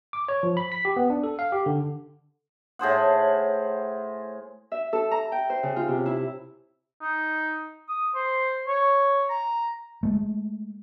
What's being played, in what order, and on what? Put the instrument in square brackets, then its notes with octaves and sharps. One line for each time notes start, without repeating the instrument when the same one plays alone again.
[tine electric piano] D6
C#5
F3
B5
B6
G4
B3
D4
A4
F5
G4
D3
[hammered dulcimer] A2 G#4 C5 F#5
[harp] E5
A4
A#5
G5
C5
C#3
F4
C3
E4
[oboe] D#4
D#6
C5
C#5
A#5
[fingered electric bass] G#3 A3